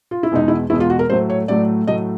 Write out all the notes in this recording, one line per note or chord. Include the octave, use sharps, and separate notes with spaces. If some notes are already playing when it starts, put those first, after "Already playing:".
F4
E4
E2 B2 G#3 D#4
E4
E2 B2 G#3 E4
F4
F#4
A#4
A2 F#3 A3 C5
C#5
A2 F#3 A3 D5
A2 F#3 A3 D#5